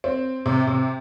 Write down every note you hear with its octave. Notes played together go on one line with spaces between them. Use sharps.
C4
C3
C3